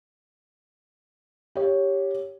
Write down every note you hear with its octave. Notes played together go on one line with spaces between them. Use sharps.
G4 C#5